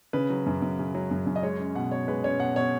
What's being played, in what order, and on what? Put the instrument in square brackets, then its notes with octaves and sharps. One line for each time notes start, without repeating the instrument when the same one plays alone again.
[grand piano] C#3 B4
F#3
F#2
F#2
C#3
F#3
F#2
F#2
D#5
G#3 C#5
C#4
B2 F#5
B2 C#5
G#3 B4
C#4 C#5
B2 F#5
B2 C#5